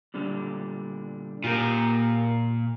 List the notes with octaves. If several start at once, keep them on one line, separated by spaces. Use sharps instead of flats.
A#2 D3 G3
A#2 F4 G4 A#4